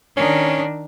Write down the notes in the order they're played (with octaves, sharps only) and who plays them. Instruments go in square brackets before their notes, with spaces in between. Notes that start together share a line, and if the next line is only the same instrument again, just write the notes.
[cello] D#3 D4 [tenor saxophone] C#4